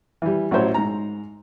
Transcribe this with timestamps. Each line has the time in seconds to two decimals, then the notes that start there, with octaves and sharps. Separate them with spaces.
0.22 E3 G3
0.51 A1 F#3 E4 C5 C#5
0.74 G#2 A#5